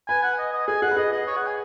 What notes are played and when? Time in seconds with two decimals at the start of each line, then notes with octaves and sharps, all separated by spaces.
0.08 B4 G#5
0.23 F#5
0.38 D#5
0.53 D#5
0.67 G#4 G#5
0.82 G#4 F#5
0.91 B4
0.97 G#4 D#5
1.12 D#5
1.27 C#5
1.36 F#5
1.47 G#5